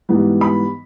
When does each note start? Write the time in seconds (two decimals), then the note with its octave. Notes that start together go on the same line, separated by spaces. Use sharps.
0.09 G#2 E3 G3 B3
0.41 B5